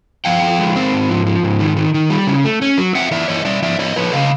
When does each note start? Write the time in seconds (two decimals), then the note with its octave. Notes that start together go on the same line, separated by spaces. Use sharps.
0.25 F3 F5 G5
0.42 F3
0.59 G#3
0.76 C4
0.93 G#2
1.09 F3
1.27 F3
1.43 G#2
1.60 D#3
1.77 D#3
1.94 D#3
2.10 G3
2.27 C#3
2.45 A3
2.62 C#4
2.78 F#3
2.95 C4 E5 F#5
3.11 E3 D5 E5
3.28 E3 C#5 D#5
3.45 G3 D5 E5
3.62 F3 D5 E5
3.79 F3 C#5 D#5
3.96 F3 B4 C#5
4.13 C#3 D#5 F5